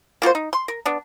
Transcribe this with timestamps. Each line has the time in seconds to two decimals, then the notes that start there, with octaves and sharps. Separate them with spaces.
0.22 A#3 F4 F#4 C5
0.35 D#4
0.53 C6
0.68 A#4
0.86 B3 D4